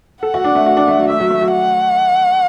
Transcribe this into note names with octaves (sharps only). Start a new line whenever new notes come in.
A4 F#5
F#4
D4
A3
F#4
D4
A3
F#3
A3 E5
F#3
A3
F#3
F#5